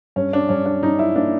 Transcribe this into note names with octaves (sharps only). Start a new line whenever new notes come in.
G2 C#4
D4
G2 C#4
D4
G2 D#4
E4
A#3 D4